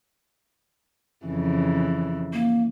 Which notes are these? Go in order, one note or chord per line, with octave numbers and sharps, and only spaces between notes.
F2 C#3 E3
A#3